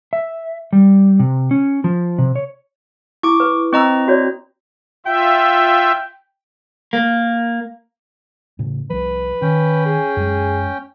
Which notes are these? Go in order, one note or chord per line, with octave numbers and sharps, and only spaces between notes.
E5
G3
C3
C#4
F3
C3
C#5
E4 C#6 D6
B4
C4 D#5 A#5 C#6 E6
F#4 C#5 D5
F4 E5 G5
A#3
A2 C#3
C2 F3 B4
D#3 C#4 G5
G#4
F#2 G#3